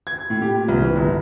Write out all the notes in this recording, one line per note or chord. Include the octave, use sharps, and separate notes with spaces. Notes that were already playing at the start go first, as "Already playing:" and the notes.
G#6
A2
G4
A#2
C2
E3
G1